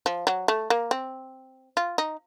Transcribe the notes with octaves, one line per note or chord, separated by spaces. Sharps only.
F3
F#3
A3
A#3
C4
F4
D#4